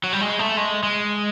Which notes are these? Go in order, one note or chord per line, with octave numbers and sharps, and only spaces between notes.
F#3
G3
G#3
A3
G#3
G#3